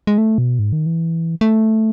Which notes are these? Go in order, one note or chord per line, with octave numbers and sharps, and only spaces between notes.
G#3
A3
B2
G#2
D#3
E3
A3